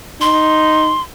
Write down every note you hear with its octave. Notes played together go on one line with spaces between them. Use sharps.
D#4 C6